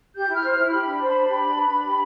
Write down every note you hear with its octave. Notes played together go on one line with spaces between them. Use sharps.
G4 G6
E4
F6
C5
F6
E4
G4 B5
D4
C5
D4
G4
D4
B4
D4
G4